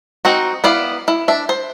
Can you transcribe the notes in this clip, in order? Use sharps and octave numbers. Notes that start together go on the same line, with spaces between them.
C4 D#4 F#4
B3 E4 D5 F5
E4
D4 E5
C5